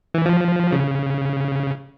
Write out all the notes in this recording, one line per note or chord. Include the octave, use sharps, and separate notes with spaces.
E3
F3
C#3